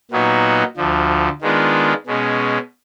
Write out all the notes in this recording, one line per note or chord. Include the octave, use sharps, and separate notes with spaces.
A#2 F#3 B3 D#4 F#4
D2 D3 F3
D#3 G#3 B3 D4 F4
B2 G#3 C#4